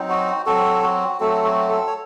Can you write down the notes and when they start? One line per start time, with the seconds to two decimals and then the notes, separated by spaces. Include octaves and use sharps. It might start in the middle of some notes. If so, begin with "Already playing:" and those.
Already playing: F#3 C4 D#4
0.10 F#4
0.46 F#3 C4 F#4 A4
0.83 F#4
1.20 F#3 A3 C4 F#4 A4
1.45 F#4
1.69 A4
1.87 C#5